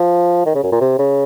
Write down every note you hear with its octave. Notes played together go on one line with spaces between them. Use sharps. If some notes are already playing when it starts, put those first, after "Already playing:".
Already playing: F3
D#3
C#3
F#2
A#2
C3
C#3